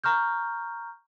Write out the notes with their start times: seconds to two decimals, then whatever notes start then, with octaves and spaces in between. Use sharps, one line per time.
0.04 A#5 C#6 F6 G6